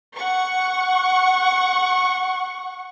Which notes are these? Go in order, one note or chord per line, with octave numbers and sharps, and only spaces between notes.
F#5 C#6